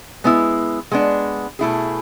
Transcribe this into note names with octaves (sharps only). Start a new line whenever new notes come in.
G#3 B3 E4
G#3 B3 D4
B2 A3 E4 G#4